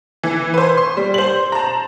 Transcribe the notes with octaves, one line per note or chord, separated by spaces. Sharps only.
E3
B4 C5
C6
G3
C5 F#7
A5 A#5